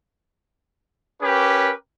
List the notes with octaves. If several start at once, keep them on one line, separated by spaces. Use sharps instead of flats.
C#4 G4 A#4 B4